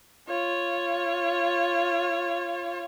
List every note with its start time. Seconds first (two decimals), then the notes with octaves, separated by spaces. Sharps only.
0.28 F4 C#5